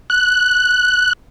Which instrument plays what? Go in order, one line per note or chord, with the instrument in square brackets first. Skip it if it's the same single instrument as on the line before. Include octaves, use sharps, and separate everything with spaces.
[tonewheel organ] F#6